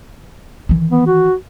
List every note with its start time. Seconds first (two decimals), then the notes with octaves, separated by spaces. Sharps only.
0.69 D#3 E3
0.92 B3
1.07 F#4